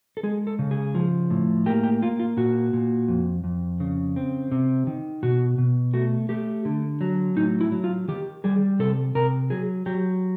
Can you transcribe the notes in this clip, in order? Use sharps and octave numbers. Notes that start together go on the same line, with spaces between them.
A4
G#3 G#4
A4
C#3
G#4
F3
A2
A#3 G4
G4
A#3 F4
F4
A#2 F#4
A#2
F2
F2
C#3
C4
C3
D#3
B2 F#4
B2
A3 F#4
A3 G4
D3
F#3
A2 D#4
E4
F#3
F4
D#3 G4
G3 G#4
C3 A4
C3 A#4
F#3 G#4
F#3 G4